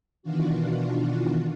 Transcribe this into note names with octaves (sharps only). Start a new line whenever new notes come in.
B2 D#3 E3 D4 F4 F#4